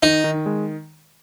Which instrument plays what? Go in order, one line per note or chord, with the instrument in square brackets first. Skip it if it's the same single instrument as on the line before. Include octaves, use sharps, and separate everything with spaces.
[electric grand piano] D#3 [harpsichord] D#4
[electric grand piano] D#3
G#3